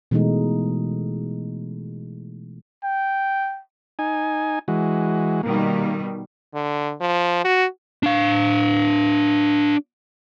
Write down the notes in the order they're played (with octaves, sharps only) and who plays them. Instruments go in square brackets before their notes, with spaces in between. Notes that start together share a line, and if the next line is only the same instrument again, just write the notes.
[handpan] B2 E3 G#3 A3 D#4
[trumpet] G5
[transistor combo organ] D#4 G#5
E3 G#3 F#4
[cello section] B2 D#3 G3 [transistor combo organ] A#3
[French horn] D3
F3
F#4
[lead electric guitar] D4 F5